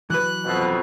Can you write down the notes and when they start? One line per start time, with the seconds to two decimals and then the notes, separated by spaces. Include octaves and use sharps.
0.10 E3 F#3 B4 F#6
0.45 F2 B2